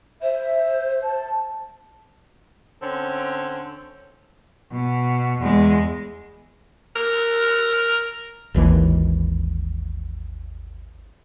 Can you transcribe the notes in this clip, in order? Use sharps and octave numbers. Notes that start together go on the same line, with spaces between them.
C5 E5
A5
D3 C4 C#4
B2
E2 G#3
A#4
G#1 D#2 E3